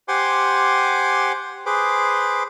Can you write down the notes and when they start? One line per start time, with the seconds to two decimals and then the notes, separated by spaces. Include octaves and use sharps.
0.08 G4 C5 F#5 G#5 C6 D6
1.66 G#4 B4 C5 D6